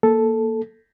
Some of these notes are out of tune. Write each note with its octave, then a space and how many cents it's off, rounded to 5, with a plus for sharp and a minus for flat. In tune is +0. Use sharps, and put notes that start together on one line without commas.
A#3 +0 A4 +0